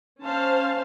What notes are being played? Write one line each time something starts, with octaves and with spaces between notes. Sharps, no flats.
C#4 C5 F5 A5